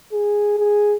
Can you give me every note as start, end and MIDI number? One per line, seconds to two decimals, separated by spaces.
0.12 0.56 68
0.58 0.96 68